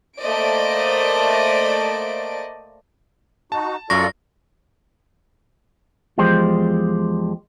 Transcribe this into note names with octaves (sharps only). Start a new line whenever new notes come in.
A3 A#3 C5 D5 D#5 D7
D#4 F#4 A5
F#2 F4 A4 D5 C#6 A#6
E2 F3 G#3 G4 C5